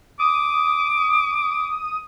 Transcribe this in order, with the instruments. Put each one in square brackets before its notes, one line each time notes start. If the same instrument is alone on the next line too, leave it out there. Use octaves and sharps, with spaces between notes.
[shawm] D6 [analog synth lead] D#6